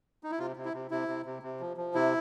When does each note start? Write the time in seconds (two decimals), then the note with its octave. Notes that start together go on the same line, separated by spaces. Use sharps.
0.23 D#4
0.31 E4
0.39 C3 F4
0.56 C3
0.65 E4
0.73 C3
0.91 C3 E4
1.08 C3
1.26 C3
1.42 C3
1.60 F3
1.77 F3
1.94 C3 E4